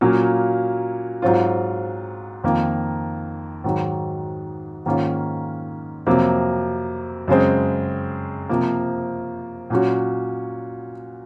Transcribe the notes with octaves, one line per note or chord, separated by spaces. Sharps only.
A#2 F#3 A#3 C#4
G#2 F#3 C4 F4
F2 D#3 A#3 F4
G#2 D#3 F#3
G#2 D#3 A#3 C#4 F4
F2 C3 F#3 A#3
F#2 C#3 G#3 C4
C3 F3 A#3
A#2 F#3 C#4 F#4